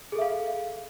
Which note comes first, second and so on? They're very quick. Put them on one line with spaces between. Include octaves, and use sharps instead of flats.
G#4 A4 E5 F5